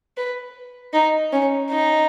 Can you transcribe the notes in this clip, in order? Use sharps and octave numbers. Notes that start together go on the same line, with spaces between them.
B4
D#4
C#4
D#4